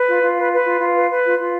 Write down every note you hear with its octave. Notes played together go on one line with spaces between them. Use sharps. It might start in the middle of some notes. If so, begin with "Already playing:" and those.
Already playing: B4
F4
F4
B4
B4
F4
F4
B4
B4
F4
F4